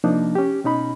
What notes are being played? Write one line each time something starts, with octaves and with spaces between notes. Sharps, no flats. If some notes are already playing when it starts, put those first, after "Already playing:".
C3 F3 A#3 D4 D#4
C#4 G4
B2 C#4 D#4 B5